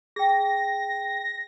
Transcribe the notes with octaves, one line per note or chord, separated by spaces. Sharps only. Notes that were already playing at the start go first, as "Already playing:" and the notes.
G#4 G5 A#6